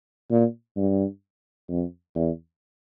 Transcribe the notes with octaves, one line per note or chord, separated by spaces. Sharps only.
A#2
G2
F2
E2